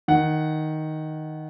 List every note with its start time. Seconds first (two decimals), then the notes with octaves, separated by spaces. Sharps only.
0.08 D#3 F#5